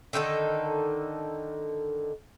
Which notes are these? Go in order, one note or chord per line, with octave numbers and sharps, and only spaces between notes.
D3 D#3 D#4 A4